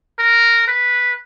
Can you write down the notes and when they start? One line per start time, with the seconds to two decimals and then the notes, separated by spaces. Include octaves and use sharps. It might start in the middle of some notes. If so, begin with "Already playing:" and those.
0.19 A#4
0.68 B4